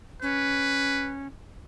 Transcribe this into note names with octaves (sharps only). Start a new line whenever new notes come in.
C#4 B4